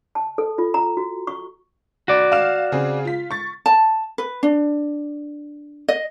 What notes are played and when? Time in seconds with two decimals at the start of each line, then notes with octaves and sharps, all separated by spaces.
0.15 A5
0.38 A4
0.58 F4
0.74 A#5
0.97 F#4
1.27 C#6
2.08 F#4 D5
2.32 F5 F6 E7
2.72 C#3 C4 G#4
3.05 F4 B6
3.31 C#6 A6
3.66 A5
4.18 B4
4.43 D4
5.88 D#5